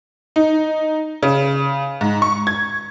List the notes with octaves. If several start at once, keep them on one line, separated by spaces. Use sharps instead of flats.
D#4
C#3
G#2
C#6
G#6